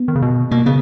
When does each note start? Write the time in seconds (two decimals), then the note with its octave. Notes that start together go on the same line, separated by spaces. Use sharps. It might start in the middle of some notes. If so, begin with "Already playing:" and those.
Already playing: B3
0.08 D#3
0.15 C#3
0.22 B2
0.51 B2 A#3
0.66 C#3 B3